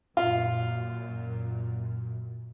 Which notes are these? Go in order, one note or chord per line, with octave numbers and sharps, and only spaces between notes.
F#2 A#2 F4